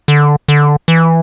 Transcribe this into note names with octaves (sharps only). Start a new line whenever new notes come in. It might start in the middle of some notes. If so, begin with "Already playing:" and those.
D3
D3
E3